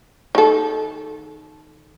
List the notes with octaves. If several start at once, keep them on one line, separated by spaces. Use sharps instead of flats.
D#3 A4